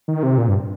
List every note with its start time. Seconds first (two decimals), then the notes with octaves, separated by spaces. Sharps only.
0.08 D#3
0.23 C3
0.38 A#2
0.48 G2